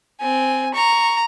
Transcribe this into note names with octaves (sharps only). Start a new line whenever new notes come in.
C4 G#5
A#5 C#6